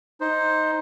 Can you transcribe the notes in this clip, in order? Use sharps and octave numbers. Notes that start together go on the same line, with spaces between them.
D#4 C5